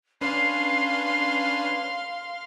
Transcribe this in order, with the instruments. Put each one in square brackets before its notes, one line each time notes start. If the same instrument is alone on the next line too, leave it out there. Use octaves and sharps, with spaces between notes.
[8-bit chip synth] C#4 D4 B4 [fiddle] F5 C6 [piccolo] C7